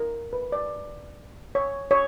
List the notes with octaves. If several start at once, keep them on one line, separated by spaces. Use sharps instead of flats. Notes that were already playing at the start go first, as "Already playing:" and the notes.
Already playing: A#4
B4
D5
C#5
C#5